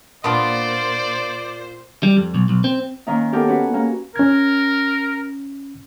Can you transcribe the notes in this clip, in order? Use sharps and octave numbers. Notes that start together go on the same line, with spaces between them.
A#2 B3 D4 F4 C5 D5
G3
F2
B1
B1
C4
D#3 A#3 C#4 D#4
A#3 B3 D#4 G4 A4 A#4
C#4 F#4 B4
A#3 C#4
C#4 A#4 G#6